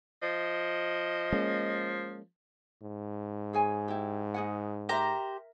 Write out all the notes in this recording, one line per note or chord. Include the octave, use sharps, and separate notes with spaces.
F3 D#5
G#3 A#3 C#4
G#2
G#4 C#5 G#5
E4 G4
D#4 G#4 F#5
G4 A#4 C5 E5 A#5